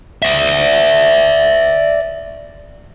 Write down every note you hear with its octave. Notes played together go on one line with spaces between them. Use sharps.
D5 E5